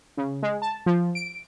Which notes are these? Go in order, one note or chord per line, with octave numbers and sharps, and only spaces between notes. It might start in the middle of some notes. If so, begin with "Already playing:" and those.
C#3
G#3
A5
F3
D7